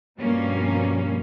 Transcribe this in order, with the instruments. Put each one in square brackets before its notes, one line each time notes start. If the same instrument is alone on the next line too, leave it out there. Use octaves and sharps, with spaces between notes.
[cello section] G2 B2 F3 G3 A#3 C#4